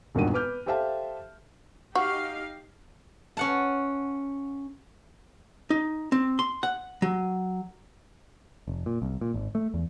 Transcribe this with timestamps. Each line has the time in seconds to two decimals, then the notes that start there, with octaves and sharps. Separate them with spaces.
0.15 E1 G2 A#2 D#3 F#4 D#7
0.34 B4 D6 F6 G6
0.66 G4 A4 C5 E5 F5 A5
1.95 D#4 F#4 G4 F5
3.37 C#4 F#5 A5
5.70 D#4
6.12 C4
6.39 C6
6.63 F#5
7.02 F#3
8.68 F1
8.86 A#2
9.02 C2
9.21 A#2
9.34 G#1
9.55 A3
9.74 E2